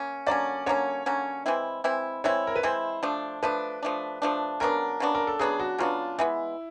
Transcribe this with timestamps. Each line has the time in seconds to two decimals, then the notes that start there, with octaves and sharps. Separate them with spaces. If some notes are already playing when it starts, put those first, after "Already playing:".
Already playing: A#3 C#4
0.26 D3 F#3 A#3 C#4 D5
0.66 D3 F#3 A#3 C#4 C#5
1.06 D3 F#3 A#3 C#4
1.46 E3 G#3 C4 E4
1.84 E3 G#3 C4 E4
2.24 E3 G#3 C4 E4 C#5
2.47 A#4
2.56 B4
2.63 E3 G#3 C4 E4 C5
3.03 F3 A3 D4
3.43 F3 A3 D4 B4
3.83 F3 A3 D4
4.22 F3 A3 D4
4.60 C#3 F#3 B3 D4 A#4
5.00 C#3 F#3 B3 D4
5.15 A#4
5.27 A4
5.39 C#3 F#3 B3 D4 G#4
5.60 F#4
5.78 C#3 F#3 B3 D4 F4
6.18 E3 G#3 B3 E4